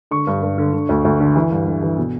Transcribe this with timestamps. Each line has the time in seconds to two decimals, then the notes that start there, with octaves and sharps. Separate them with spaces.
0.11 D3 C#6
0.27 G2
0.42 G2
0.58 D3
0.73 D3
0.89 D2
1.05 D2
1.20 D3
1.36 E3
1.51 G2
1.67 G2
1.82 E3
1.98 B2